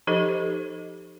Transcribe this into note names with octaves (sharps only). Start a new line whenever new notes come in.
F3 D#4 G4 A4 C5 D#5